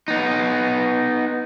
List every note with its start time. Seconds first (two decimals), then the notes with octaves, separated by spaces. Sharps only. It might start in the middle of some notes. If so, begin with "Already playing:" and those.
0.08 B3 D#4